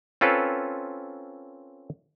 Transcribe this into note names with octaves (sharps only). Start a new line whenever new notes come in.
C4 C#4 F4 A4 B4